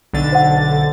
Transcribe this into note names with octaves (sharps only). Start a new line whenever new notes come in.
B1 D3 A6
C5 F#5